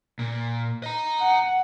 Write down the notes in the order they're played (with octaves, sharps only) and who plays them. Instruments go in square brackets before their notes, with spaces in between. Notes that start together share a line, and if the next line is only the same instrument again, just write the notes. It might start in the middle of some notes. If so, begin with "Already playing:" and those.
[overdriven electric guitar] A#2
D#5 A#5
[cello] F#5